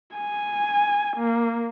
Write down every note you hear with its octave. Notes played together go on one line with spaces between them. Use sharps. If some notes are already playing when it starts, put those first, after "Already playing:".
G#5
A#3